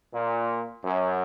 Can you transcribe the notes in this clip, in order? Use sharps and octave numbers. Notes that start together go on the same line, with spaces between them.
A#2
F#2